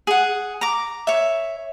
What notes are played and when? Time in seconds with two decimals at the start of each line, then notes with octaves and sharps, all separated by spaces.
0.07 G#4 F#5
0.61 A#5 D6
1.07 C#5 E5